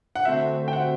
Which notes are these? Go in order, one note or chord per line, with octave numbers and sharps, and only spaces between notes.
F#5
D3 A3 C4 F#4 C5 E5
G5
F#5